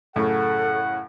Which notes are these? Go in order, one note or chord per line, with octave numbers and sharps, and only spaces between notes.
F#2 A2 C#3 A4 F#5